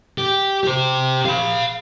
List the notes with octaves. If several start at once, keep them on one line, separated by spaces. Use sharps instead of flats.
G4
G4 C5
F5 B5